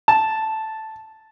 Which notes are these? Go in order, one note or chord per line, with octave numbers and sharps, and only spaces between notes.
A5